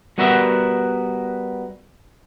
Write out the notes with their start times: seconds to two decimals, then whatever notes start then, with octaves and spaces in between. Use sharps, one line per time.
0.18 G3 B3 F#4 A#4 B4 E5